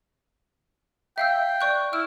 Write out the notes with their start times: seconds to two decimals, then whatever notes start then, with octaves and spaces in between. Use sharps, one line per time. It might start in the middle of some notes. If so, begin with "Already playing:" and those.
1.18 E5 F5 G5 E6
1.61 D5 C#6 F#6
1.93 E4 F6 D7